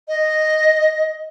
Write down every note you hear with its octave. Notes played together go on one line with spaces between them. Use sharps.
D#5